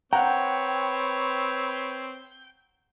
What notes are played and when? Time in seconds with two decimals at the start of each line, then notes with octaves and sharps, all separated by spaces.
0.13 C4 B4 C#5 F#5 G5 A#5